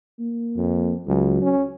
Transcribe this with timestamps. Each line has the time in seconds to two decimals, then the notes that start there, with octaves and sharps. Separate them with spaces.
0.19 A#3
0.57 F2
1.07 C#2 F#3
1.42 C#4